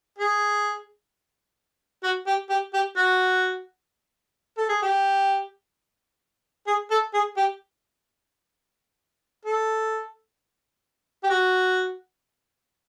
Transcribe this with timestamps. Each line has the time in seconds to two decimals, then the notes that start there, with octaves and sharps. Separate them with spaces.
0.18 G#4
2.04 F#4
2.27 G4
2.50 G4
2.74 G4
2.97 F#4
4.57 A4
4.69 G#4
4.82 G4
6.67 G#4
6.90 A4
7.13 G#4
7.37 G4
9.45 A4
11.24 G4
11.30 F#4